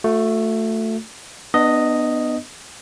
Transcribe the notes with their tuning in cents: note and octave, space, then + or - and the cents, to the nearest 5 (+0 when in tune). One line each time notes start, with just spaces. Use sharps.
A3 +10 F#4 -35
B3 +0 D4 +35 D#5 +0